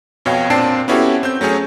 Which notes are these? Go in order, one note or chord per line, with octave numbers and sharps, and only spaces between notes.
F2 B2 C#5 F5 G5
A#2 C4 D4 A5 C7 D7
B3 C#4 E4 F#4 G4 A4
C4 G6
F#3 A3 C#4 G#4 C#5